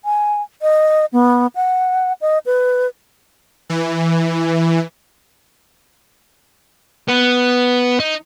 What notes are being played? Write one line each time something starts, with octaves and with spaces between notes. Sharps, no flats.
G#5
D#5
B3
F#5
D#5
B4
E3
B3
D#4